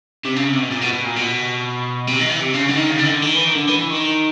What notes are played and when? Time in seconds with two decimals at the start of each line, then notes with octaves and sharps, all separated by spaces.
0.25 C3
0.36 C#3
0.48 C3
0.59 B2
0.71 A#2
0.82 B2
0.93 B2
1.05 A#2
1.16 B2
2.07 C3
2.19 D#3
2.30 E3
2.42 C3
2.53 C#3
2.68 D3
2.75 D#3
2.90 C#3
2.98 D3
3.05 D#3
3.11 D3
3.22 D#3
3.33 E3
3.44 D#3
3.55 D3
3.67 E3
3.78 E3
3.90 D#3